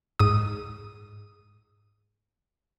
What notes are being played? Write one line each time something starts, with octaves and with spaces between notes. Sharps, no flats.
G#2 D#6